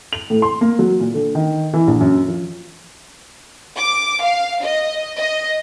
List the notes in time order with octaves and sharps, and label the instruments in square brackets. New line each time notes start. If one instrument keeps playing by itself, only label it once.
[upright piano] F7
A2
C6
A#3
F#3
A#2
D3
D#3
E3
A#1
F#2
F3
[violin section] D6
F5
D#5
D#5